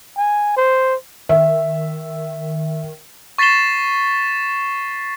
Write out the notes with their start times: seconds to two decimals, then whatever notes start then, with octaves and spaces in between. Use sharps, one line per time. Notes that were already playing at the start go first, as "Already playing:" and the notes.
0.17 G#5
0.57 C5
1.29 D#3 E5
3.38 C#6 A6 B6 C7 E7 G7